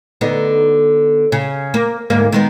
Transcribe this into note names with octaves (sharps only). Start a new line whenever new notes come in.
D3 B3 D#4
C#3
A#3
D2 G#2 A#3
D#3 G#3 B3